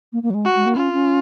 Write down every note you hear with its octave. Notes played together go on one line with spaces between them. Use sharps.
A#3
A#3
F#3
G#3
F#4
G#3
A#3
C#4 F4
C#4